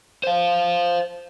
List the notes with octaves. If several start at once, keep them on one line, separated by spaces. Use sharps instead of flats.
C5 F5